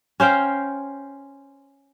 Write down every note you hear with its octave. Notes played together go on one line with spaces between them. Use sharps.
C#4 C5 F5 G5